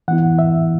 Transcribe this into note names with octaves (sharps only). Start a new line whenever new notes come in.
E3 B3 E4 F#5
E5